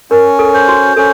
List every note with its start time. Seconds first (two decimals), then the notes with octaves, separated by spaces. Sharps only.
0.10 C#4 A#4
0.39 A4
0.54 C5
0.68 F#4
0.97 C#4 A4